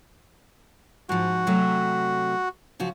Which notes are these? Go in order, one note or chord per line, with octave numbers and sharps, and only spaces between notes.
G#2 F3 F#4
C3 F#3 A3
C#3 F3 F#4